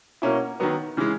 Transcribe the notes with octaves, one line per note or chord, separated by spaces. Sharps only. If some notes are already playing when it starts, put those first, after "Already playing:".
B2 A#3 C#4 E4
D#3 F#3 B3
C#3 E3 G#3